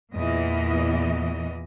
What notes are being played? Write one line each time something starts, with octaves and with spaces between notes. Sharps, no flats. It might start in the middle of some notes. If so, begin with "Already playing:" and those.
E2 A#2 E3 D#5